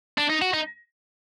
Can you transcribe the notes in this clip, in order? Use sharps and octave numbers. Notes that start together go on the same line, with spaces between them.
D4
D#4
F#4
D#4